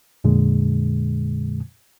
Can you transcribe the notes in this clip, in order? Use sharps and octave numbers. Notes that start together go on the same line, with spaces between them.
F2 A#2 D3 G#3